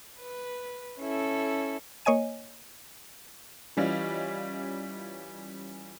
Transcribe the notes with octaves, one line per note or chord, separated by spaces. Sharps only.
B4
C#4 E4 A4
A#3 C#5 D#5 G#5 D#7
E3 G3 C#4 F4 D#5